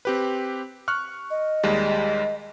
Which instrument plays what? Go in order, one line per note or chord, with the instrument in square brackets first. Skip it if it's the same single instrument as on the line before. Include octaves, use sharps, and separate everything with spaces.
[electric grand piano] C4 G4 B4
C#6 F6 F#6
[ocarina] D#5
[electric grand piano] D#2 G3 G#3